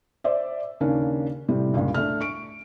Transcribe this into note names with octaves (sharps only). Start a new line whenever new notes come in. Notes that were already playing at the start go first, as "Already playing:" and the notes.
C5 D5 E5
D#2 C#3 A#3 C#4 D4
A2 C3 G3
C#2 G2 A#2 C#3
A3 D4 F6
C#6 D7